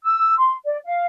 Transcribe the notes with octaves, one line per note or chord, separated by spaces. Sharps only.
E6
C6
D5
F5